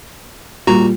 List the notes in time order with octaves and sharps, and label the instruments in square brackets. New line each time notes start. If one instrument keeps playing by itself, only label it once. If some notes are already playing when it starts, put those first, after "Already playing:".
[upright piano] A#2 [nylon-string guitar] G3 [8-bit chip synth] F#4 A#5